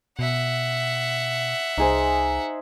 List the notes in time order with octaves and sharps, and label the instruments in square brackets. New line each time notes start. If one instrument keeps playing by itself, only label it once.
[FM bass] B2 [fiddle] E5 F#5
[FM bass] C2 [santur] D#4 G#4 C5